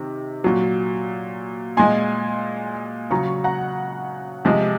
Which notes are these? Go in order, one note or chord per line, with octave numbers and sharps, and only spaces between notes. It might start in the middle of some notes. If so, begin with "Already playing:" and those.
Already playing: C3 D#3
A#2 F#3
A#2 G#3 G#5 C6
C#3 F#3 A#5 C#6
F#5 A#5
C3 F3 G#3